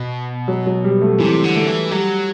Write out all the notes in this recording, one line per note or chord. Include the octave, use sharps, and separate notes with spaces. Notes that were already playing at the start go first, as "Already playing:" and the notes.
Already playing: B2
F#3
F#3
G3
A3
C3 E3
D3
A3
E3
F#3 G3